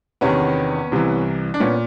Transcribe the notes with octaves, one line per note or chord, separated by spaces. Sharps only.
E2 C3 D#3 B3 C#4
C2 C3 E3
D4
A#2 B3 C#4